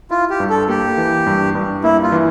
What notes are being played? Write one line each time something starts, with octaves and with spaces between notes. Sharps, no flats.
E4 F4
G4
G2
A4
A#3 G4
E3
G2
G2
A#3 E4
F4
E3